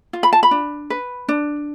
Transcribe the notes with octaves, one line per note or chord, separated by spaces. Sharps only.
F4
B5
A5
B5
D4
B4
D4